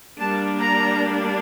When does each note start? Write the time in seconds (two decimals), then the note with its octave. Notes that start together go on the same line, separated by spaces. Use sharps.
0.20 G3 A#3 D4 A5
0.59 A#5